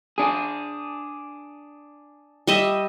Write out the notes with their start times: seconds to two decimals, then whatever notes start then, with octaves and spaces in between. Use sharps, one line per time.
0.18 D4 G#4
2.47 G3 D#5 E5